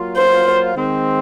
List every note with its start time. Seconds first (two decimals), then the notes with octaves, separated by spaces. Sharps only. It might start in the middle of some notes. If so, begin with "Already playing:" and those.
Already playing: F#3 A#3 F4
0.17 C5
0.74 D#3 G#3 C4